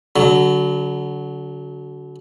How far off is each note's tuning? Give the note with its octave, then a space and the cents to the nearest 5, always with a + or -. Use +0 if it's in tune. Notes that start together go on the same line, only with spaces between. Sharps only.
D3 -35 F#3 +0